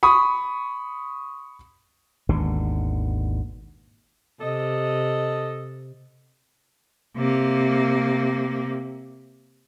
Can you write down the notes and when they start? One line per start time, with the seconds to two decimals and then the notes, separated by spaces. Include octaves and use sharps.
0.03 B5 C#6 D#6
2.29 G#1 D#2 B2 D3
4.40 C3 A4 D#5
7.16 C3 A#3